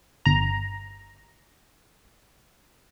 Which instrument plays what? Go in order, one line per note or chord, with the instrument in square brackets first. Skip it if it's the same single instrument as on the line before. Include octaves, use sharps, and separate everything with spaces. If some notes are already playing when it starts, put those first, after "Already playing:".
[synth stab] G1 A#5